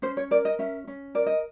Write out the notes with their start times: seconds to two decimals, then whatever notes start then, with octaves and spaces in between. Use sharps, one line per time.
0.02 C#4 C5
0.17 C#5
0.31 A#4 D5
0.45 D#5
0.59 C#4 E5
0.87 C#4
1.15 A#4 D5
1.26 D#5